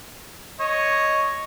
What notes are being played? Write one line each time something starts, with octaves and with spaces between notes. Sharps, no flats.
C#5 D#5